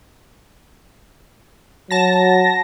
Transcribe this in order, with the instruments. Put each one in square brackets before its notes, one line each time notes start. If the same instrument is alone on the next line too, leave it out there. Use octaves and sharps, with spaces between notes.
[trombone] F#3 [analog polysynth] A5 A#6